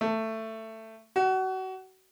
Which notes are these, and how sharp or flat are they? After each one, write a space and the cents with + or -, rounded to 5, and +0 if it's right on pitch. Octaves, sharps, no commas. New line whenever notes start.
A3 +15
F#4 +30